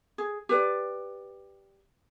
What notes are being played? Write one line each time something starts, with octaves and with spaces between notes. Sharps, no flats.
G#4
G4 B4 D5